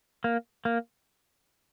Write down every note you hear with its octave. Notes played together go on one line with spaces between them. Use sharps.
A#3
A#3